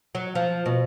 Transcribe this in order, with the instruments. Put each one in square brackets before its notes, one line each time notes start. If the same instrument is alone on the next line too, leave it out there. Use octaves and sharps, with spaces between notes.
[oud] F#3
F3
B2